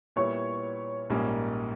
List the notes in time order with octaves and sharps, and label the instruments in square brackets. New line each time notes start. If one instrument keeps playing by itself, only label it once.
[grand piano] A#2 G3 B3 E4 [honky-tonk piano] C#5
[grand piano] A#1 G#2 G3 A#3 C#4